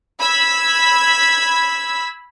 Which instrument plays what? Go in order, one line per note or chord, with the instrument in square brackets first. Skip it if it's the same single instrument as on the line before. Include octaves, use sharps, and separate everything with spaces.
[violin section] B5 E6 G#6 B6